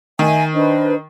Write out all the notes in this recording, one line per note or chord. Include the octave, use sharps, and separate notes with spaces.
D#3 D#5 E5 G#5
D4 B4 C5 D#5